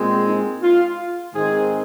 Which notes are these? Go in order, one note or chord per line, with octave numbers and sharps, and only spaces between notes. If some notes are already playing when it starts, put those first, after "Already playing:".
Already playing: A#2 G#3 C4
D#4
F4
G#2 D#3 G#3 C4 G#4